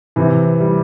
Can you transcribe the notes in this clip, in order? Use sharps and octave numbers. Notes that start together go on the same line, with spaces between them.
C3 E3
G3